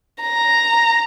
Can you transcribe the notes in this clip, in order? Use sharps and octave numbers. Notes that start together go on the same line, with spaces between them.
A#5